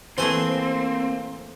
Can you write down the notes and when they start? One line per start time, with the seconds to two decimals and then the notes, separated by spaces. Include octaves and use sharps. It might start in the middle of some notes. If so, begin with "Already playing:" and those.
0.18 E3 A3 A#3 C4 G#4 C5 G#5